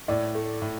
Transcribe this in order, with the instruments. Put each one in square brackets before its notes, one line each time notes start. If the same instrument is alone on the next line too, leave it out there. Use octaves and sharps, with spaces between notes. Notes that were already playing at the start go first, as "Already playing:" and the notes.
[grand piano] A2 [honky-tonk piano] D5
[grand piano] A3
A2